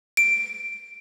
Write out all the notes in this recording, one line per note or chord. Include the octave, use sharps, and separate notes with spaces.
D7